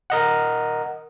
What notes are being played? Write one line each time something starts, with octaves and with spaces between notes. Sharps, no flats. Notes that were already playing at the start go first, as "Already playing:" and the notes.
A#4 D#5 F#5